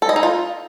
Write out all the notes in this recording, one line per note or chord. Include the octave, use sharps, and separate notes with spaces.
A4
D#5
D#4
F4